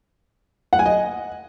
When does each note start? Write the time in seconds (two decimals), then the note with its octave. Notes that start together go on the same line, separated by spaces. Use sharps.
0.73 F#5
0.79 G#5
0.86 D#5